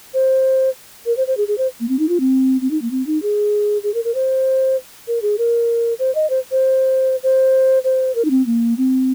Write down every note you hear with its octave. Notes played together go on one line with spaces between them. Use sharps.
C5
A#4
C5
C5
G#4
G#4
C5
A#3
C4
D#4
F4
C4
C4
D#4
A#3
C4
D#4
G#4
G#4
A#4
A#4
C5
A#4
G#4
A#4
C5
D#5
C5
C5
C5
C5
A#4
D#4
C4
A#3
C4